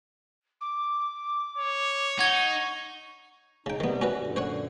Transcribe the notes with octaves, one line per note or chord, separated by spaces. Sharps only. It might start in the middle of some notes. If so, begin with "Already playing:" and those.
D6
C#5
D#4 F#5 C#6 G#6
C#3 D#4 G5
C3 D#3 G3 B3
C#4 F#4 B4
F#2 A#2 D3
C5 C#5 F#5